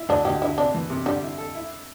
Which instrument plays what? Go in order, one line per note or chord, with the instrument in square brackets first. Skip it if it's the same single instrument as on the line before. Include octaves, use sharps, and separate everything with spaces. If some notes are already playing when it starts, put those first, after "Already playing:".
Already playing: [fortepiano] E4
[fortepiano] D2 [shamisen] D4
[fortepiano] D2 [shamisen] G4
[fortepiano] D3 [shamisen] E4
[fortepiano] C3 [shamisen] D4
[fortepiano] E3
C3
[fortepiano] D3 [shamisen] G3
[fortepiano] E4
A4
E4